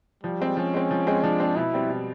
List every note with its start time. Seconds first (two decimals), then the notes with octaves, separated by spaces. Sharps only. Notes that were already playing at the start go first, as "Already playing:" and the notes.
0.23 F3 G3
0.40 G#3 C4
0.57 F3 C#4
0.74 G#3 C4
0.91 F3
1.07 G#3 C4
1.23 F3 D4
1.40 G#3 C4
1.56 B2 E4
1.73 G3 C4
1.90 B2